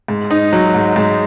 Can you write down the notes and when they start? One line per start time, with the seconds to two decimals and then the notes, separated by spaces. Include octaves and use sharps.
0.08 G#2
0.31 D#4
0.53 F#3
0.75 G#2
0.96 G#2